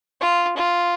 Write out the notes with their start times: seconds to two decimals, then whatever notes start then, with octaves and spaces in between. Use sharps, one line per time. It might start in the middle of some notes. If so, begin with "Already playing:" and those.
0.21 F4
0.57 F4